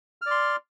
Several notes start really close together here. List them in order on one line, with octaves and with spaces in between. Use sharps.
F6 D5 C6